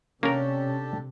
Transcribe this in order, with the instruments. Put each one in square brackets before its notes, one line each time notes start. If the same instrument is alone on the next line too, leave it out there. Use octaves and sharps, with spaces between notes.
[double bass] C3 [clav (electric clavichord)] A#3 A#4 [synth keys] C#4 [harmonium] D4 G4 A4